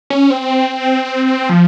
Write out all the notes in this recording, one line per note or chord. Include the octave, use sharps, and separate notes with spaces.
C#4
C4
F3